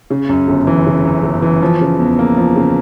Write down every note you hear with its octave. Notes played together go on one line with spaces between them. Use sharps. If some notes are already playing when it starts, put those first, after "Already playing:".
C#3
F#2
G1
E3
C#3
F#2
G1
E3
F3
C#3
E2
A#3
F3
C#3